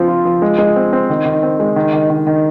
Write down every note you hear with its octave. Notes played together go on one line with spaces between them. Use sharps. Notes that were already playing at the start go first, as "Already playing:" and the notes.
Already playing: F3 C4
F4
F3
G#3
G#3
C4
C4
D#3
D#3
C4
G#3
D#3
D#3
D#3
D#3